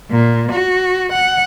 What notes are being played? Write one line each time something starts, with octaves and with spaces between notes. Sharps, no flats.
A#2
F#4
F#5